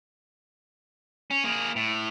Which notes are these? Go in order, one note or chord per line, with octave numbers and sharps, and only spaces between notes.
C#4
A#3 G#4
A2